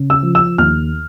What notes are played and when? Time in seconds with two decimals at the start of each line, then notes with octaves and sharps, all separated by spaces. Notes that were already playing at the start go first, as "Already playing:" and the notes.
Already playing: C#3
0.10 E6
0.23 F3
0.35 E6
0.58 D#2 F6